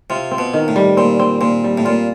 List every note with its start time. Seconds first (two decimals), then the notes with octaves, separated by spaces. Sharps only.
0.10 C3 F4
0.31 C4
0.38 B2
0.53 D#3
0.68 A2
0.76 G3
0.97 A#2 C4
1.19 C4
1.41 A#2 C4
1.64 G3
1.78 A2
1.85 A#2 F4